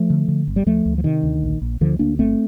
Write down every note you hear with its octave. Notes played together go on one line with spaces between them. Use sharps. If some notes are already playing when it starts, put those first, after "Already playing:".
Already playing: F3 A3
D3
D3
G1
G3
D2 F3 A3
D2
F3
C3 D#3
D2
A#1
A#1
D2 D3 F3
D2 A#3 D4
G1 A3 C4